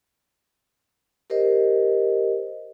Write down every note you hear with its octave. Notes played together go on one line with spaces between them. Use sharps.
G4 A#4 C5 D#5